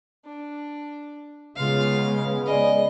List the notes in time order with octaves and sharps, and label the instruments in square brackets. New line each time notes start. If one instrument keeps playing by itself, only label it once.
[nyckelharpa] D4
[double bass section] C#3 G#3 B3 [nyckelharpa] F4 F5
[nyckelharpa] G#4 D#5 [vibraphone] D5 G#5 B5